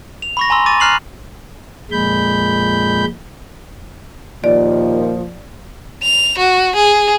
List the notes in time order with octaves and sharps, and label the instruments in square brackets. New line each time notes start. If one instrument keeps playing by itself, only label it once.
[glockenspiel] F7
B5 C#6 A#6
G#5 A#5 C6 E6
C#6 D6 A6 D#7
A#5 F6 F#6 C7 F7 F#7
[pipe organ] F2 A#2 G#3 B5 G6
[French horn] D#2 [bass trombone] A#2 [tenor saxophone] F3 [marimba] D5
[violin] F7
F#4
G#4